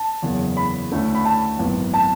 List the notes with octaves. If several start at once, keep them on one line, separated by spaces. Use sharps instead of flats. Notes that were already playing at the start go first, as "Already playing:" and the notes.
Already playing: A5
F#1 E2 C#3 E3
B5
D2 D3 A3 C#4 E4
B5
A5
G#1 F#2 E3 B3
A5